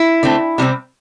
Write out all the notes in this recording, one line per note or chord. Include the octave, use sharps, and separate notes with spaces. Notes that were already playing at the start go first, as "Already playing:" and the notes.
Already playing: E4
D3 A3 C4
C3 G3 C4